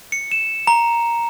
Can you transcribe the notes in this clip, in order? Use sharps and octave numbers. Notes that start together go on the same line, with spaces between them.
C#7
E7
A#5